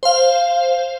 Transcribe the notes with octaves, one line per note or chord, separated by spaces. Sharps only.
C5 F5